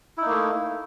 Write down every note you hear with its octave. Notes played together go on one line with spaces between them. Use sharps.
A3 A#3 D#4 E4